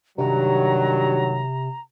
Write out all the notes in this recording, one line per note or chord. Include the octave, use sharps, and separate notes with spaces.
G2 C3 D#3 F#3 A#5